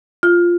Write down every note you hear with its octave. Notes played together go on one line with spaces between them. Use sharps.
F4